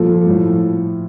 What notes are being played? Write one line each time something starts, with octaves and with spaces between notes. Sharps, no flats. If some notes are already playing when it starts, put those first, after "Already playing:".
Already playing: A#2 F3 A4
A2 F3